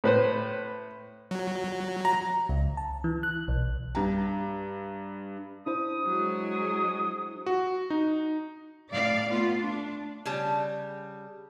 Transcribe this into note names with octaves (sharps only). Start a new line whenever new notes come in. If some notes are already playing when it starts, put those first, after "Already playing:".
A2 B4 C5
F#3
A#5
C#2
A5
E3
F#6
B1
G2 A#5
D4 E4 C5 D#6
F#3 G#3
F#4
D#4
A2 D5 F5
A3 B3 F4
D4
C#3 G3 A5